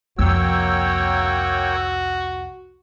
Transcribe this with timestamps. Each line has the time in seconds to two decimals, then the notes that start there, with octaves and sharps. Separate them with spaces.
0.19 C2 F2 A#3 F#4 C#5 G5 E6